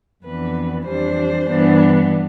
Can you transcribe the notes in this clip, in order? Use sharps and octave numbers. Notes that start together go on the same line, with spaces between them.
F2 E3 B3 D4 B4
F2 E3 G3 D4 C5
G2 E3 B3 D4